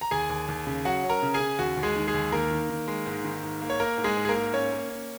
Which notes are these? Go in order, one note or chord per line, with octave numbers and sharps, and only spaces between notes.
A#5
D#2 G#4 G#5
D#2
D#2
C#3
F#3 F#4 F#5
C#4
A#4 A#5
C#3
G#4 G#5
C#3
D#2 F#4
D#2
G#3 G#4
D#3
G#3 G#4
D#2
D#3 A#3 A#4
D#3
D#3
G#3
G#2
D#3
G#2
A#3
C#5
A#3 A#4
G#2
G#3 G#4
G#2
G#4
A#3 A#4
G#2
A#3 C#4 C#5
A#3
C#4